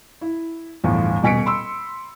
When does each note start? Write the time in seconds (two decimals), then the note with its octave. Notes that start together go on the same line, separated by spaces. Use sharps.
0.21 E4
0.84 G1 E2 A2 F3
1.23 D#1 B2 G#5 B6 C#7 D7
1.46 B5 C6 E6